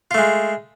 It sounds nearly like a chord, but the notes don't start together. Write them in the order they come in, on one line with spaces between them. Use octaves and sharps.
F4 A3 G#3